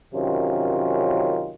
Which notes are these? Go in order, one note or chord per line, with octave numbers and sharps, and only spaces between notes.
F#2 C3 D#3 C#4 F4